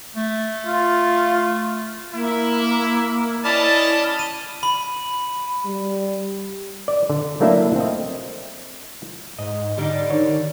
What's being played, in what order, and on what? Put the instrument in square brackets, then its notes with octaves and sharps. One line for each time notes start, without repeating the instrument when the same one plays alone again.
[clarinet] A3
[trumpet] F4
[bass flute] A#3 [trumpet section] E4
[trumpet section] C#4 D#5 A5 [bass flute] E4 [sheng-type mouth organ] D5 B5 F6
[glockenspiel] D#7
B5
[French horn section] G3
[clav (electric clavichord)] D5
D3
F#3 A3 A#3 D4 E4 E5
C4 D#5
[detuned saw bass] G#2 [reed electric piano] D#5
[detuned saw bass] D3 [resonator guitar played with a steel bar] G3 D4 D#4
[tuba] D#3 [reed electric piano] C#5